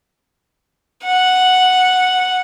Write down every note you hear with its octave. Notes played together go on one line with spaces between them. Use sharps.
F#5